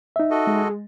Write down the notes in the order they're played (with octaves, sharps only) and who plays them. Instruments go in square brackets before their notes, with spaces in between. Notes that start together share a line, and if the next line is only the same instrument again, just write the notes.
[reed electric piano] D#4 E5
[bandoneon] F#4 A4 D#5
[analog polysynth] G#3